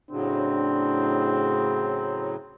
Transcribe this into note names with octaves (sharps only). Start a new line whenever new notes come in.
A2 C#3 F#3 C4 D4